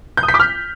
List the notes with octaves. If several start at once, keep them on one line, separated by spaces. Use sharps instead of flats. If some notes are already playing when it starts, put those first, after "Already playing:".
G6
D#6
B6
D6
F6